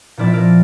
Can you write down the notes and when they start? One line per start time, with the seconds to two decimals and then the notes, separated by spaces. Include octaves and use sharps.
0.17 A#2 F3 C4 E4 D5
0.26 E5
0.33 A#4 D5